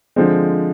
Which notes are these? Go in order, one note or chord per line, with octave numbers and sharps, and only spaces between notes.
D3 F3 G#3 C4